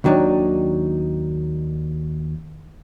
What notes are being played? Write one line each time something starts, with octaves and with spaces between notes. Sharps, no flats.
D#2 D#3 F#3 D4 D#4